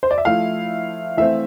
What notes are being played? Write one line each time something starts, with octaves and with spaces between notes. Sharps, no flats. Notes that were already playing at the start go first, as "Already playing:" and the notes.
C5
D5
E5
F3 A3 E4 F5
E3 A3 C4 E5